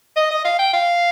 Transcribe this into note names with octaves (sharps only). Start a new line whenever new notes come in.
D#5
D#5
F5
G5
F5